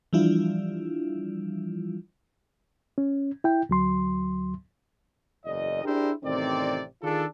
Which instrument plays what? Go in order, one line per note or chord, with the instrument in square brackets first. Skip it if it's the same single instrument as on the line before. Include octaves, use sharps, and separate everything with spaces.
[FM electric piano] E3 F3 G3 D4 E4 F4
[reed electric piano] C#4
E4 G5
D2 F#3 C6
[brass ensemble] F#1 E2 D5 D#5
D4 E4 G4 G#4 A#4 C5
A1 C3 D#3 C4 D5
D#3 D4 F4 G#4 A4